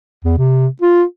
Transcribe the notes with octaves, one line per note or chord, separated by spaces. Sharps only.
E2
C3
F4